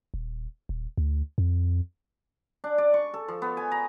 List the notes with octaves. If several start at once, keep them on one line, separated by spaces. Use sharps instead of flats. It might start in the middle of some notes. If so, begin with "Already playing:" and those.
D#1
D#1
D2
F2
D4
D5
C#6
A4
F3
B3
G#5
A#5